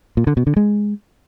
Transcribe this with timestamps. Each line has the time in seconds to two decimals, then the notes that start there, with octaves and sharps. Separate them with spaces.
0.17 A#2
0.27 D3
0.37 B2
0.47 D3
0.56 G#3